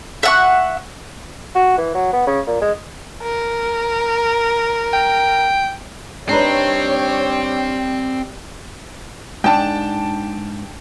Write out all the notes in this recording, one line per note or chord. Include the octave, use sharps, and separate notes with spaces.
E5 F#5 C#6
F#4
E3
F#3
B3
C#3
A#2
G#3
A#4
G5
G3 C4 D4 D#4 B4 C#5
G#2 D4 G5 A5